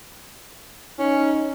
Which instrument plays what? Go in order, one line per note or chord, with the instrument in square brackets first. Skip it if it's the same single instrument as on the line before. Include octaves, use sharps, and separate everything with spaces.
[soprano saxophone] C#4 [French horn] D#4